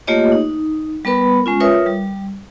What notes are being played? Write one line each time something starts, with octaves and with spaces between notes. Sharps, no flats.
A3 A#3 F4 G4 C#5 D#5
D#4
G3 B3 A#4 B4 B5
G#3 C#4 F4
F4 A#4 B4 C#5 E5 D#6
G3